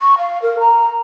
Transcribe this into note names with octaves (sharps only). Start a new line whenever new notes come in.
C#6
F5
A#4
A#5